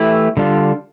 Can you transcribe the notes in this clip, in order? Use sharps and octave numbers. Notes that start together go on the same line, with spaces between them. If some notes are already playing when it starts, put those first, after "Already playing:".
Already playing: E3 A3 E4 G4
D3 G3 D4 F4